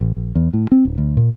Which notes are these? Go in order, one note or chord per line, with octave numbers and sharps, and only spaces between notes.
A1
A#1
E2
A2
C4
D1
D2
A#2